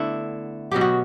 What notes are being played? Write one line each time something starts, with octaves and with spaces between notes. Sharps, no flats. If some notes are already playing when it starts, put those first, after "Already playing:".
Already playing: D3 A3 B3 E4
B2 F#3 B3 G4
F#4